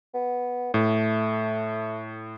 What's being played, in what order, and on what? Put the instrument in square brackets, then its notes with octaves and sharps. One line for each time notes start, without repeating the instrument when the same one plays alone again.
[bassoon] B3
[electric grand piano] A2 [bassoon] A3